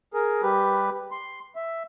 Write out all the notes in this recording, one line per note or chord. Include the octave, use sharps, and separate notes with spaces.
G#4 A#4
G3 G4 B4
C6
E5